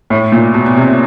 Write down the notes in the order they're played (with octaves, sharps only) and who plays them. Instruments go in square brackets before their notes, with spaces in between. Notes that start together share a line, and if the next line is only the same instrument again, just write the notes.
[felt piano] A2
A#2
B2
B2
C3